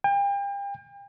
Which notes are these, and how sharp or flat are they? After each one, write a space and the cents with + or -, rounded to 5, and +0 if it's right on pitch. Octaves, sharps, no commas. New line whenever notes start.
G5 +35